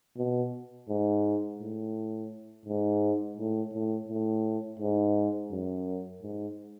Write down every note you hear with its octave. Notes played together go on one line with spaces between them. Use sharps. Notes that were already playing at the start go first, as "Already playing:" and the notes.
B2
G#2
A2
G#2
A2
A2
A2
G#2
F#2
G#2